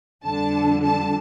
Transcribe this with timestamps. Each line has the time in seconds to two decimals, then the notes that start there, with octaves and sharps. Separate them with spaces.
0.24 F2 D3 G3 A5
0.83 A5